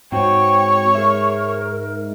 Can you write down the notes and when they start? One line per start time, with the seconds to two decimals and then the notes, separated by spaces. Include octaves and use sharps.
0.12 G#2 C4 F#4 C#5 G5
0.95 G#4 A#4 E5